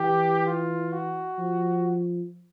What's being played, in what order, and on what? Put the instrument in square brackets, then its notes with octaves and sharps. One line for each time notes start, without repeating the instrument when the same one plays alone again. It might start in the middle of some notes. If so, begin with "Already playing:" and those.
Already playing: [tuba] E3 [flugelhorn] G4
[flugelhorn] F4
F#4
[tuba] F3